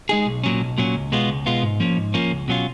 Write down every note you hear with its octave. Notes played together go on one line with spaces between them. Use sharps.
G#3 D#4 G#4
B1
A#2 F#3 C#4
B1
A#2 F#3 C#4
C#2
B2 G#3 B3 F4
C#2
B2 G#3 B3 F4
G#2
F3 A#3 C#4
G#2
F3 A#3 C#4
C#2
B2 F#3 C#4 F4